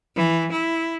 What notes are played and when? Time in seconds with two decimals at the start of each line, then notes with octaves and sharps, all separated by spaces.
0.16 E3
0.52 E4